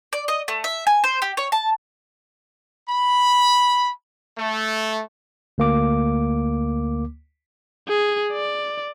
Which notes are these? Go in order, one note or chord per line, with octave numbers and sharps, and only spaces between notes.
D5
D#5
A3
E5
G#5
C5
G4
C#5
A5
B5
A3
D2 A#3 D6
G#4
D5